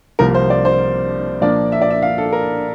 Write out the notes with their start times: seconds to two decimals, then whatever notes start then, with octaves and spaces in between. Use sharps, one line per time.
0.19 C2 C3 F3 A#3 A#4
0.35 C5
0.50 D5
0.65 C5
1.41 A#2 F3 A#3 D4 D5
1.72 E5
1.82 D5
1.90 E5
2.02 F5
2.18 A4
2.33 A#4